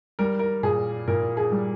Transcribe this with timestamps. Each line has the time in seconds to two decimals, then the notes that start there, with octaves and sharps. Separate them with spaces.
0.19 G3 A#4
0.39 A#4
0.63 A#2 G#4
1.08 A#2 A#4
1.37 G#4
1.52 G3